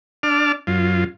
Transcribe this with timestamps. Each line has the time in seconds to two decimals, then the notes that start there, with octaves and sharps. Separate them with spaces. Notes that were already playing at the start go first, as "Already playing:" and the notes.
0.23 D4 A5 D6 F6
0.67 F#2 F4